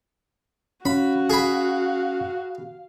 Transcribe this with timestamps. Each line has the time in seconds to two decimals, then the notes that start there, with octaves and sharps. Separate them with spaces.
0.85 C#4 F#4 F5 B5
1.30 G#4 B5